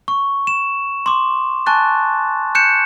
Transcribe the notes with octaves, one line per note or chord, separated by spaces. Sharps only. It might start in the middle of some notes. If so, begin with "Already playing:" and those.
C#6
E7
C6 D6
G#5 A5 C#6 F#6 A6
F#6 G6 C#7 E7